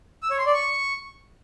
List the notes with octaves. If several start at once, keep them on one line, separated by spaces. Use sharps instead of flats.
E6
C#5
C6
D5
C#6